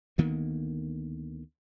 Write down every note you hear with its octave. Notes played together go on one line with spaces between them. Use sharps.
D2 D#3 A#3 B3